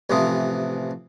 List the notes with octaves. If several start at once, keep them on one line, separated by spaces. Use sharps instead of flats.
A1 C3 E3 F3 D#6